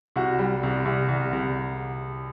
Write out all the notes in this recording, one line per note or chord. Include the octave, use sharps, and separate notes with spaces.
C2 F#4
G3
C2
C2
C2
C2